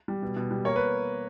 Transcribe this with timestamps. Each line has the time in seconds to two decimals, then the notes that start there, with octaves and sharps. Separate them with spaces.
0.08 G3
0.22 B2
0.36 B2
0.51 G3
0.65 A#3 C#5
0.76 B4